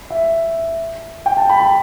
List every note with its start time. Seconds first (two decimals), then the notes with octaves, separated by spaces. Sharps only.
0.10 E5
1.26 G5
1.37 A5
1.50 B5
1.60 B5